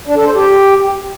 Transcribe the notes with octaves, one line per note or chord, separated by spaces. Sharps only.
D4
A4
C5
G4